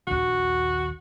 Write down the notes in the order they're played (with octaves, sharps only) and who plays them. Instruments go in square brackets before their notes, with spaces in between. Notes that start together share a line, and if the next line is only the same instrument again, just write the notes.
[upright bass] A#1 D#2 [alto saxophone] F#4